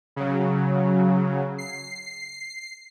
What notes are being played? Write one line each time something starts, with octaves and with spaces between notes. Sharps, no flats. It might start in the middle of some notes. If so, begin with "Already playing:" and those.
C#3 F#3
C7